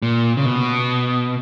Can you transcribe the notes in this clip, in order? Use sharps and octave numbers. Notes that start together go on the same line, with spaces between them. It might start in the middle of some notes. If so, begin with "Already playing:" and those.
A#2
C#3
B2